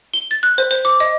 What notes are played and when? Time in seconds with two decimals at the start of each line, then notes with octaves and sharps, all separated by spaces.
0.14 G7
0.31 A6
0.43 F#6
0.58 C5
0.71 C5
0.85 D6
1.00 D#5